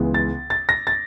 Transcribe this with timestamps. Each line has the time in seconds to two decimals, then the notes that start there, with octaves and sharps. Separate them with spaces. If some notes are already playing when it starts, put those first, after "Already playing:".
Already playing: C#2 C#3 E3 G#3 B3
0.14 A6
0.50 A6
0.69 A#6
0.87 A6